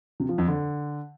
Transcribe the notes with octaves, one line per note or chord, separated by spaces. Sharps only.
C3
F3
F2
D3